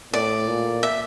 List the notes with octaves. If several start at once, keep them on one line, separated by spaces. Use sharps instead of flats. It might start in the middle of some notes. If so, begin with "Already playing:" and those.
A2 D5
A#2
E5